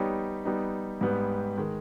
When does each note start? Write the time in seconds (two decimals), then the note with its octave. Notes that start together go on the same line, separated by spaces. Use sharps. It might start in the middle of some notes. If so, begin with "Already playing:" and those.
Already playing: G3 B3 D#4 G4 C#5
0.45 G3 B3 D#4
1.01 G#2 G3 B3 G4 B4
1.57 D#3 G#3